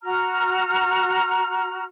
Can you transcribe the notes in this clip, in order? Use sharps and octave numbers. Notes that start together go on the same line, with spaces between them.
F#4 A#5 F6